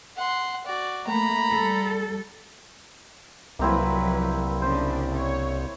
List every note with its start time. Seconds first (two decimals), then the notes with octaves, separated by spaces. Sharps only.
0.16 F#5 C6
0.66 F#4 D5
1.07 A3 A#3 A#5 B5
1.51 G3 A4
3.59 C2 F3 F#3 A#3 C4 E4 B4
4.62 C#3 D4 C5
5.16 C#5